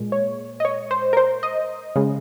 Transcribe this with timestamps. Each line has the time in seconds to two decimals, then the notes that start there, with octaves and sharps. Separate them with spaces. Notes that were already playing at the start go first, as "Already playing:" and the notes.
Already playing: A#2 G#3
0.12 C#5
0.60 D#5
0.65 C#5
0.91 C5
1.13 A#4
1.17 C5
1.43 D#5
1.96 C#3 G#3